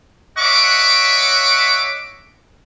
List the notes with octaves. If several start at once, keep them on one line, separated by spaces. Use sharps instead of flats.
C#5 D#5 E5 F#5 C#6 D6